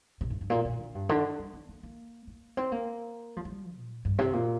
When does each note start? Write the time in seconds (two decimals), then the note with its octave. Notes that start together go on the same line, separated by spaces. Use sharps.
0.21 C3
0.30 G2
0.41 G2
0.50 A#2
0.65 A#2
0.79 D3
0.95 G2
1.09 D3
1.39 G3
1.54 C4
1.69 A#3
1.83 A#3
2.27 A#3
2.57 C4
2.72 A#3
3.37 F3
3.45 G3
3.75 A#2
4.05 G2
4.18 C3
4.33 A#2